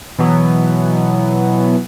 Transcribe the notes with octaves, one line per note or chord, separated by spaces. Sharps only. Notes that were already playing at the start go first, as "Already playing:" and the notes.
B2 E3 F#3 B3